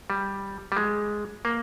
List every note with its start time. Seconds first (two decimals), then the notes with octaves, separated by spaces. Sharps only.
0.10 G3
0.72 G3
0.77 G#3
1.45 A#3